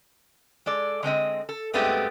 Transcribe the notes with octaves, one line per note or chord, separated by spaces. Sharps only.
G#3 A4 D5
D3 G#3 C4 D#5
A4
G2 G#3 A3 B3 C4 G4